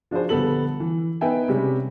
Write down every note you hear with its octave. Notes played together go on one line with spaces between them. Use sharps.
F3 D4 F#4 G#4 C5
A#1 D3 G3 B3 A4 F#7
E3
B3 D#4 B4 E5 G5 G#5
C3 G3 G#3 C#4